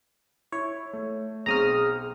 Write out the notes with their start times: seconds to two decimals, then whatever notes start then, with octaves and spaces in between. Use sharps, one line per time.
0.52 E4 C#5
0.93 A3
1.46 B1 C4 G#4 A#5 C#6 D#6 F6